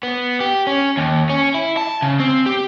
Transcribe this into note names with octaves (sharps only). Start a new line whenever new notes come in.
B3
G4
C#4
D#2
C#4
E4
A5
C#3
C4
G4